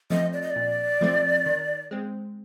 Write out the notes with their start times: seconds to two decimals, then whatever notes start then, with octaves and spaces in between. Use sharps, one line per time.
0.10 F3 A3 C4 D#5
0.33 D5
0.42 D#5
0.50 D5
0.56 A#2
1.01 F3 A3 C4
1.46 D#3
1.91 G#3 C4